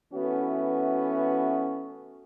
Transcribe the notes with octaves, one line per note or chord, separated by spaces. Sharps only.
E3 A3 B3 C#4 F#4